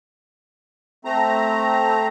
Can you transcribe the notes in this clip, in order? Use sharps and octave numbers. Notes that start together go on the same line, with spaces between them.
A3 C4 A#5